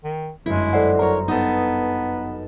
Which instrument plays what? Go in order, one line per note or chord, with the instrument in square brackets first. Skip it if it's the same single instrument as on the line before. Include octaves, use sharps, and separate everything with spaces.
[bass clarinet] D#3
[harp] G1 F#2 [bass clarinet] G#3 [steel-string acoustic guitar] E4
[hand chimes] A4 D5 F#5 [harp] C5 E5 C6
[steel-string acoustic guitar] A#4 C#5 [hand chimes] A#5
[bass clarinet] B3 [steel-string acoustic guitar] D#4 A4 [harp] B4 D#6